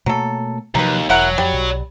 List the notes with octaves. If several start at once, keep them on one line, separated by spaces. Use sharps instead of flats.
B2 F#3 A3 A#3 A4
D#2 C3 F3 F#3 D#4 B4
E1 F#3 E4 A#4 F#5
F2 G3
B1